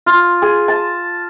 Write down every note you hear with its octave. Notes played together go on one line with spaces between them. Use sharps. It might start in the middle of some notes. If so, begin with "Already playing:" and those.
F4
G#4
A5